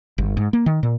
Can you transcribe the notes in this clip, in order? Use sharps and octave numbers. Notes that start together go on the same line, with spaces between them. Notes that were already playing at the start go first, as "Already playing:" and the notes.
G1
G#2
A#3
D#3
A#2